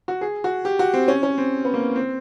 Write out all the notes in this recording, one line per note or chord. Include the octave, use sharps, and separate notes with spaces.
F#4
G#4
F#4
G4
F#4
C4
C#4
C#4
C4
B3
A#3
C4